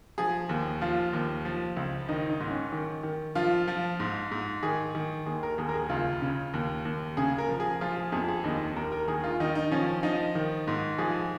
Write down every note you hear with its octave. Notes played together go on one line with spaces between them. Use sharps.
F3 G#4
D#2
F3 F4
D#2
F3
C#2
D#3 D#4
D#4
G#2
C#4
D#3
D#3
F3 F4
F3
G#2
G#2
D#3 G#4
D#3
D#2 G#4
A#4
D#2 G#4
A#4
G#4
C#2 F4
C#3
D#2
D#2
C#3 G#4
A#4
F3
G#4
F3 F4
G#4
F2 G#4
G#4
D#2 D#4
D#2 A#4
A#4
D#3 G#4
F4
D#3 D#4
D#4
F3 C#4
F3 D#4
D#3
G#2
F3 G#4